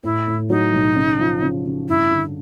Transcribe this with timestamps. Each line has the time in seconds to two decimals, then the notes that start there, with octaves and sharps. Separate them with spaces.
0.04 A2 E4
0.27 A2
0.50 F#3 D#4
0.74 B1
0.96 C#3
1.19 F3
1.42 C#3
1.66 C#3
1.89 G2 E4
2.11 D3